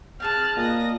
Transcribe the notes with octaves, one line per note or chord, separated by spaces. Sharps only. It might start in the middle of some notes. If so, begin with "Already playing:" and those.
C4 G#4 A5 F6 F#6 A6
A#2 D#5 A#6